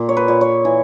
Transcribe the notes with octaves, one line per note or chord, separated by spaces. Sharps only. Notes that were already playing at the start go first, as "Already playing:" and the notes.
Already playing: A#2
C#5
B4
A#2
C#5
E3